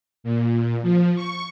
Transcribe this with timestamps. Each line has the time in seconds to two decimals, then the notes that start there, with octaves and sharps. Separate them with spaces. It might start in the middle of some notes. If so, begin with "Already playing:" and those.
0.24 A#2
0.83 F3
1.16 C#6